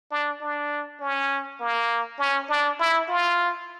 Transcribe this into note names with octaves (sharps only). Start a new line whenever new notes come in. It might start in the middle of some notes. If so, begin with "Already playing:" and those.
D4
D4
C#4
A#3
C#4
D4
E4
F4